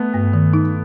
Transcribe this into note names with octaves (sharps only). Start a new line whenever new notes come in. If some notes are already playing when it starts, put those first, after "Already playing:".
Already playing: A3 B3
G2
D#3
D#4